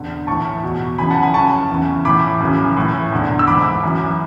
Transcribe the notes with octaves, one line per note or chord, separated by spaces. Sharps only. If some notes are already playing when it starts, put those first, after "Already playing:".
Already playing: E2 D3
A2 E3 A5 C#6
E2 B2
F#2 C#3 E3 G#5 B5
F#5 A5
G#5 B5
F#2 C#3 E3 A5 C#6
E2 C#3 E3
A2 E3 B5 D6
F#2 C#3 E3
A2 E3
E2 D3
E6
G#2 E3 B5 D6
F#2 E3